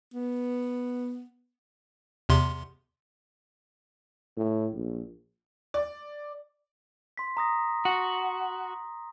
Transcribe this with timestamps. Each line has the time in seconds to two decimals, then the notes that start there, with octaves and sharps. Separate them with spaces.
0.14 B3
2.29 E2 C3 C6
4.37 A2
4.75 A#1
5.74 D5
7.17 C6 B6
7.37 A#5 D#6 A#6
7.85 F#4